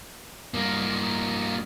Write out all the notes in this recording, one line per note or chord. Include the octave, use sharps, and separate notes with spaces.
G2 A#3